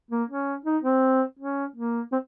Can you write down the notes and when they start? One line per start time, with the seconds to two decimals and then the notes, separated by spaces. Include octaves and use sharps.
0.11 A#3
0.29 C#4
0.65 D#4
0.84 C4
1.39 C#4
1.76 A#3
2.12 C4